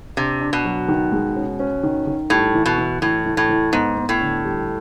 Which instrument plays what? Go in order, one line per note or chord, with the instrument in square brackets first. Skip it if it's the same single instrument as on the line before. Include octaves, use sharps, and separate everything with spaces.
[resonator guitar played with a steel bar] C3 [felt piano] D4
[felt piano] D4
[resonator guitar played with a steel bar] B2
[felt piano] F#3
D#3
G#3
C#4
C#4
D#3
D#3
[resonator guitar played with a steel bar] A2 [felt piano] G3
[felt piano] E3
[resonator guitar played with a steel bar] B2
[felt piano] E3
[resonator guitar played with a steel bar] A2 [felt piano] E3
[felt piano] E3
[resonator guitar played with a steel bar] A2
[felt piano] E3
[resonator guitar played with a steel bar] G#2 [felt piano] B3
[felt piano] B3
[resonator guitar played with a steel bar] A2
[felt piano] D3
G3